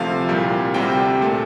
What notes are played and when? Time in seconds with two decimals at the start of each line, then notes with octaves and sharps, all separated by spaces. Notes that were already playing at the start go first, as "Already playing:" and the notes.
Already playing: D2 C3 F3 A3 F5
0.28 C2 A#2 G3
0.74 D2 C3 G3 G5
1.21 A#2 A3